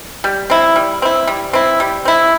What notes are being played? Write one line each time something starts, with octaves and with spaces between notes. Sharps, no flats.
G3
C4 E4
G3
C4 E4
G3
C4 E4
G3
C4 E4